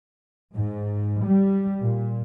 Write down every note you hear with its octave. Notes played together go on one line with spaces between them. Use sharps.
G#2
G3
A#2